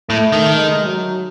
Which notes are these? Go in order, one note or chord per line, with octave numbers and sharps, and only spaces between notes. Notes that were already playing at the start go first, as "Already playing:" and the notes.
A2 A3
D#3
G#3
F#3